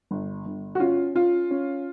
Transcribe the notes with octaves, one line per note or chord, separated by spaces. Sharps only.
G1
G1
F#4
C#4 F4
C#4 F4
C#4